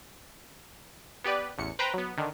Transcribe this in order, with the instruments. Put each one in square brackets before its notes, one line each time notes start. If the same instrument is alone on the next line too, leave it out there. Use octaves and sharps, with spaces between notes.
[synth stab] B3 G4 B4 D5
A1 E2 C#7
B4 C5 G5 A#5 B5
F#3 B3
D3 D#3